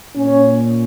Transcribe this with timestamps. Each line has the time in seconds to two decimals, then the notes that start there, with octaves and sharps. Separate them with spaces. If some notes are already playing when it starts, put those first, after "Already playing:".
0.16 A#2 C#4